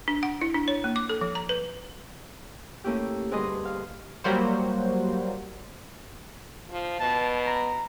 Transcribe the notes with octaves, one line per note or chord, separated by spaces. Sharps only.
D4
F#5
E4
D4
C#5
A#3
D6
A4
F3
A#5
B4
A3 A#3 C#4 E4 G4
D2 G2 G#4 B4 D#5 C6
F5
F#3 G3 A#3 F#4 C5
F3
B2 A5
A#5